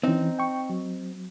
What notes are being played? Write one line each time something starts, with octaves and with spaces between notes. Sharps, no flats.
E3 C4 C#4 D#4
G5 C#6
F#3